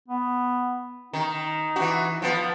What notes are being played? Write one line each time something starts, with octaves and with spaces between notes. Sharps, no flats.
B3
D#3 D#4
E3 F#4
F3 B3